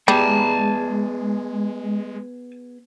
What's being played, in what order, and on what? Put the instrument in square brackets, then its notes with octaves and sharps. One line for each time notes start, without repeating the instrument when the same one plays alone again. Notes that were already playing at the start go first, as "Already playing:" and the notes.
[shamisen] G3 [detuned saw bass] G#3 [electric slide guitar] B3 G#4 [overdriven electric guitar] G#5 A5